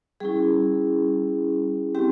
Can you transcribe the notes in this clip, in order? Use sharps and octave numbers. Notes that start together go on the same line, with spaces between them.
G3 C#4 E4 G#4
G3 C4 E4 G4